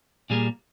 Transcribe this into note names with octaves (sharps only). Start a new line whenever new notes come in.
A#2 G3 A#3 G#4